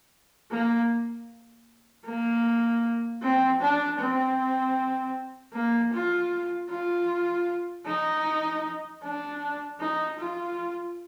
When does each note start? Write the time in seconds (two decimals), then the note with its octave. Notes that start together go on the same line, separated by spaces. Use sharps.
0.51 A#3
2.06 A#3
3.23 C4
3.61 D4
3.99 C4
5.54 A#3
5.93 F4
6.70 F4
7.87 D#4
9.03 D4
9.80 D#4
10.19 F4